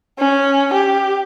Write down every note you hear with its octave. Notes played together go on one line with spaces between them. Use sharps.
C#4
G4